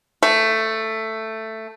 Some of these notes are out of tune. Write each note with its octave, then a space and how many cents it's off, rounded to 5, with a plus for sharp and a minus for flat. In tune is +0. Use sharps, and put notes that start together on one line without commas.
A3 +10